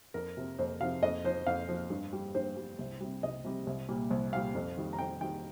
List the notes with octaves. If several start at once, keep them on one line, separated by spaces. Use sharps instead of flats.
F2 A#4
C3 F3
F2 C5
C3 F3 F5
F2 D#5
F3 C5
F2 F5
F3
G2
G3
G2 C5
G3
C2
C3 G3
C2 D#5
C3 G3
C2
A#2 G3
C2
A#2 G3 F5
F2
D#3 G3
A#5
F2 G5
D#3 G3 G5